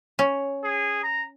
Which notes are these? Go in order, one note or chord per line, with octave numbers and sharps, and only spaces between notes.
C#4
G#4
A#5